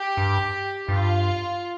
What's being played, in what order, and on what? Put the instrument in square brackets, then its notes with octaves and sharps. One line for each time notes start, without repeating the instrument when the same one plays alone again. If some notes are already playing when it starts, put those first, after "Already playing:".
Already playing: [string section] G4
[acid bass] G2
[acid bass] G2 [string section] F4